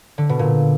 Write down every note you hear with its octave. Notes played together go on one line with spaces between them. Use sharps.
D3
B2
A#2